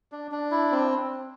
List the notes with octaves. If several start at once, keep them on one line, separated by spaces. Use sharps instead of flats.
D4
D4
E4
C4